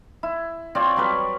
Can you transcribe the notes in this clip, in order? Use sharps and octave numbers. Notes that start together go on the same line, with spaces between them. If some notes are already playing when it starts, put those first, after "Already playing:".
E4
C4 F4 C#5 D5
F#3 G3 B4